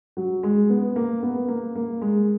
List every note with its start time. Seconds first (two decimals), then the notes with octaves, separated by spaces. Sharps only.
0.17 F#3
0.43 G#3
0.70 B3
0.96 A#3
1.23 B3
1.48 A#3
1.75 A#3
2.02 G#3